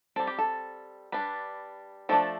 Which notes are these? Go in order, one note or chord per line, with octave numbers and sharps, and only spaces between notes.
G3 C4 A4
G4
A4
G3 D4 B4
F3 A3 D4 A4